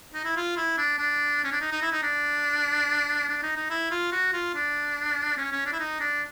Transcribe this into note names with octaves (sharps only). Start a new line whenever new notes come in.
D#4
E4
F4
E4
D4
D4
C#4
D4
D#4
D#4
E4
D#4
D4
D4
D#4
D#4
E4
F4
F#4
F4
D4
C#4
C#4
D4
E4
D#4
D4